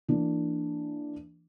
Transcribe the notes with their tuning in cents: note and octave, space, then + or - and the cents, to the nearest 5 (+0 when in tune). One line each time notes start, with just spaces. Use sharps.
E3 +20 A#3 -20 D4 +0